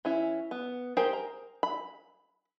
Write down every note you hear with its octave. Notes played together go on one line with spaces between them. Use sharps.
E3 C#4 E4
B3
G4 G#4 A#4 C5 G5
A#5
B5